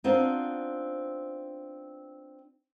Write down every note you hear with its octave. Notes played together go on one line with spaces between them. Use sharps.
B3 C4 D4 D#4 F4 C5